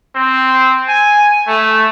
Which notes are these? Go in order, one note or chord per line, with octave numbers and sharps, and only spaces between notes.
C4
G#5
A3